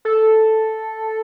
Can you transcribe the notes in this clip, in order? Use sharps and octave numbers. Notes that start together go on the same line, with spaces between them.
A4